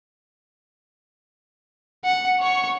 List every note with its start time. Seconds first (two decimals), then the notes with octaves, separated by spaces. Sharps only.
2.04 F#5
2.40 C#5 C#6